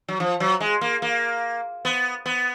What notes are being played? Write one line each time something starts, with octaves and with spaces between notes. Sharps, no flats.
F#3
F3
F#3
G#3
A#3
A#3
B3
B3